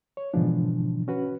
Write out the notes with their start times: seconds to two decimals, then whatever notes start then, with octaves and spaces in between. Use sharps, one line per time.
0.17 C#5
0.34 G#2 B2 D3 E3 F3 D4
1.08 C#4 F#4 B4